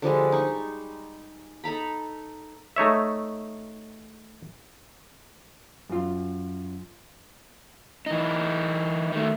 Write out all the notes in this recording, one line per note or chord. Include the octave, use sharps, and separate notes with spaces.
D3 F3 G3 G#3
D#4 C#6
D#4 A4 A#5 B5
A3 D#4 C#5 E5
F#2 F4
E3 D#4
D#3 A3